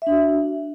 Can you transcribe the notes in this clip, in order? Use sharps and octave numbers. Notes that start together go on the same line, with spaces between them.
D4 F#4 E5